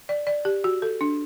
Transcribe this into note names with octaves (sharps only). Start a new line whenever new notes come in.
D5
D5
G4
F#4
A4
D4